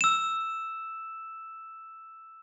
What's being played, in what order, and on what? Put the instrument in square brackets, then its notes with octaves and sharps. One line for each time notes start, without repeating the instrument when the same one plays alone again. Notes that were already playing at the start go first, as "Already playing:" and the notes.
[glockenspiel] E6 E7